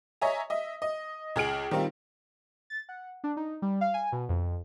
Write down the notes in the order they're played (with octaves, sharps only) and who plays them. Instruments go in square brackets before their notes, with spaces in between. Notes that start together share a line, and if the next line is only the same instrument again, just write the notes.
[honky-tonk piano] C#5 D#5 E5 G#5 A#5
D#5 E5
D#5
C#2 G#4 F6 D7 F#7
D#3 G3 C4 D#4 F4
[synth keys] A6
F#5
D4
D#4
G3
F5
G#5
B2
F2